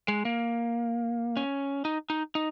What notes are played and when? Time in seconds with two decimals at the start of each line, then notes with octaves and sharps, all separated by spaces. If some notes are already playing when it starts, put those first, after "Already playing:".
0.08 G#3
0.25 A#3
1.37 C#4
1.85 D#4
2.10 D#4
2.35 D#4